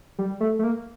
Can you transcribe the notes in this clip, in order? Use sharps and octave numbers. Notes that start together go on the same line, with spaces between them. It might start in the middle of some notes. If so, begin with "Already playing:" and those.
G3
A3
A3
A#3